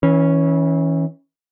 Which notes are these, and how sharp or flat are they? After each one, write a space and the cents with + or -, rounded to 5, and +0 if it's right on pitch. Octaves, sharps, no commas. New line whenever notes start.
E3 -30 C#4 +0